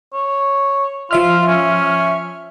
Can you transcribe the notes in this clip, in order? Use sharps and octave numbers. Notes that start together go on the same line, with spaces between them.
C#5
F3 F4 E5 F6
C#4